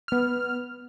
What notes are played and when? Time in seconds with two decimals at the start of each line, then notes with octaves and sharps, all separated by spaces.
0.08 B3 F6